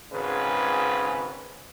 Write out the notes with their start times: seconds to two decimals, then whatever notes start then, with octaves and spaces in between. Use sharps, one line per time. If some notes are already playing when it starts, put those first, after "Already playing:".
0.12 G#1 G#2 C#3 B4